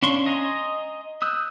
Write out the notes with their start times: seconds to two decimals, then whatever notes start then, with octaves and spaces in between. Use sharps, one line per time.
0.03 C#4 D4 F5 C6 C#6
0.26 D#5 G#5 A#5 C6
1.22 D#6 E6 F#6 G6